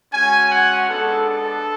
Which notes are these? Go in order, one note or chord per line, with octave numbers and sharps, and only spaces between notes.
G#3 C#4 F#4 G#5
F#5
G#3 B3 D4 A4
A4